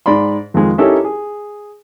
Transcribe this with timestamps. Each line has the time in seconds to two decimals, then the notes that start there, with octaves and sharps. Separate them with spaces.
0.06 G#2 D5 B5 C6
0.54 F2 D#3 F3 G#3
0.78 C#4 D#4 E4 G4 A4 A#4
1.05 G#4